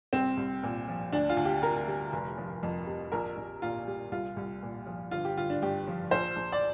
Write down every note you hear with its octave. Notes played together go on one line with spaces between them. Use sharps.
C2 C4
C2
A#2
F3
D2 D4
F4
D2
G4
C3 A#4
G3
F1
F3
F2
C3
A#1 A#4
A#1
A#2 F4
G3
C2 F4
C2
A#2
F3
G1 F4
G4
G1 F4
D4
G2 G4
F3
A#1 C5
A#1
D5